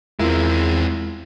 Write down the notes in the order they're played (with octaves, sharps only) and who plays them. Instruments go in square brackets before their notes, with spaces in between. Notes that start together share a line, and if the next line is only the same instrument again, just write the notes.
[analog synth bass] E2 [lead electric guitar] G#3 C4 [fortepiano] E4 F4 A#4